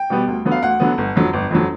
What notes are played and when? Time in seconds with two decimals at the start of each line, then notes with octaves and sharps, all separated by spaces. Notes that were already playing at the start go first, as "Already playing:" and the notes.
Already playing: G5
0.10 B2 G3 B3
0.28 D2
0.45 D3 F#3 B3
0.51 F5
0.62 D2 F#5
0.80 D3 F#3 B3
0.98 G1
1.16 F2 D3 F#3
1.33 G1
1.51 F2 D3 F#3